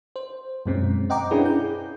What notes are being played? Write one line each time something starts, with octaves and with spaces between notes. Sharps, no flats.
C5
F#2 B2 G#3 C4 C#4
C5 D#5 F#5 G5 A#5 D6
C#4 D4 E4 G#4 B4
G6